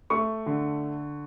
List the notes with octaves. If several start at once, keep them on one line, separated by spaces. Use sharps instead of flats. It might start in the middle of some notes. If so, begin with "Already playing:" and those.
A3 C#6
D3